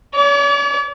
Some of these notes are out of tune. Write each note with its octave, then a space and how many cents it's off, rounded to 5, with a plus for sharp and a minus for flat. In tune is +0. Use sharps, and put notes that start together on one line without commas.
C#5 +45 D6 -35